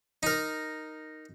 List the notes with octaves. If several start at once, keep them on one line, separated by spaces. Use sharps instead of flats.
D#4 A#4